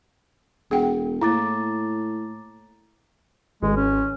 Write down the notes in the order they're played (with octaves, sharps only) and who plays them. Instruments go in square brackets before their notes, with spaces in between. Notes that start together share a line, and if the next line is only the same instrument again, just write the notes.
[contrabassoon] E1 [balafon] G#4 F#5 G5
[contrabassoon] A2 [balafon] A#3 E4 [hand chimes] A#5 D6 A6
[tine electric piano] G#1 [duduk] G#3
[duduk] C#4